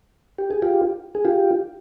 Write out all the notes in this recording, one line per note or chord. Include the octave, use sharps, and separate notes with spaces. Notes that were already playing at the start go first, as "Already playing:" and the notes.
G4
G#4
F4 G4
G#4
F4 G4